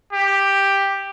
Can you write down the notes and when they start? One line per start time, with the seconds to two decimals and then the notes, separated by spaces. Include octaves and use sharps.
0.13 G4